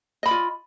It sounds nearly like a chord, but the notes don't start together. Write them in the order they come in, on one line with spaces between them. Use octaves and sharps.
D#5 B5 D5 F4